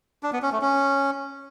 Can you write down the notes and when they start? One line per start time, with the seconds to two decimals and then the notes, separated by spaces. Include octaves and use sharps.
0.23 D4
0.33 B3
0.42 C#4
0.52 A3
0.61 C#4